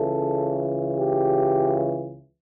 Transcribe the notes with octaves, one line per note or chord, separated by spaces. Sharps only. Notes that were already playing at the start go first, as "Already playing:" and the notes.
Already playing: C#2 C#3 E3 A4
G4